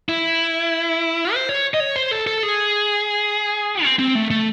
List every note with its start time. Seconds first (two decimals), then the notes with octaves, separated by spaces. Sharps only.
0.09 E4
1.34 C5
1.49 C#5
1.74 D#5
1.80 C#5
1.96 C5
2.11 A4
2.27 A4
2.43 G#4
3.84 C4
3.99 C4
4.15 A3
4.31 A3